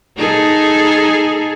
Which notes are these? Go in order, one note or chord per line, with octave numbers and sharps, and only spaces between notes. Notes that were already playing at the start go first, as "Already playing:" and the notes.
D#4 G#4 A4